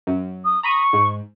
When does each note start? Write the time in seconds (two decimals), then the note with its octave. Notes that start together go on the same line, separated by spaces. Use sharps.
0.07 F#2
0.45 D#6
0.63 A#5 B5 C#6 D#6
0.93 G#2